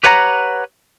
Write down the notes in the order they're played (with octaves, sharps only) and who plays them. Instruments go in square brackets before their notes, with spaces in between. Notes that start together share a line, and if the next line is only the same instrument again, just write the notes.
[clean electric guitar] G4 B4 C#5 F#5 A5 A#5